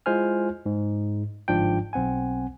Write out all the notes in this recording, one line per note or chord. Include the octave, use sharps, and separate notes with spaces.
G#3 E4 F4 C5 G#5 F6
G#2
G1 G#2 F3 D4 F4 G5
B1 C4 F#5 G#5